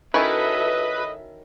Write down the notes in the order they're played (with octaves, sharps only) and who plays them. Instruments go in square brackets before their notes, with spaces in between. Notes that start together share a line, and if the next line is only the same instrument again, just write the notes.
[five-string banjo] D#3 C#4 E4 [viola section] F#4 A4 E5 [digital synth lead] B4 [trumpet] D#5